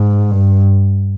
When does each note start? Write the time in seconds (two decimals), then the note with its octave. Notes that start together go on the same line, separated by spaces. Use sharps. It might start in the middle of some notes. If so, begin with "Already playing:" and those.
Already playing: G#2
0.31 G2